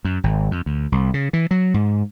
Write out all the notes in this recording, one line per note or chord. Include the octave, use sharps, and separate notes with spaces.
F#2
G#1
F2
D2
C2
C#3
E3
F#3
G#2